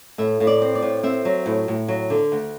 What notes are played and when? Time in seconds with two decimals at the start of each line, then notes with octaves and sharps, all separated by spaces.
0.18 A2 E5
0.40 A2
0.47 D5
0.62 C4
0.75 D5
0.83 A2
1.03 C4 E5
1.25 F#3
1.46 A2
1.68 A2
1.88 F#3
2.10 D3
2.32 D2